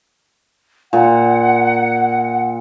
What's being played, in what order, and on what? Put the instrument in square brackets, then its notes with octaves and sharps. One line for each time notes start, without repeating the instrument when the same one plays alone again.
[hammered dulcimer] A#2 [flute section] F#5